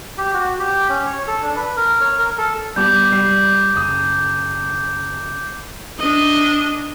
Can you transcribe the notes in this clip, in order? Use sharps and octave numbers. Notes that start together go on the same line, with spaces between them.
G4
F#4
G4
C#4
C#5
A4
D4
B4
A#4
C#5
A#4
A4
G3 B3 G4 D6 G6
G3 C7
F#1 D#6
D4 D#5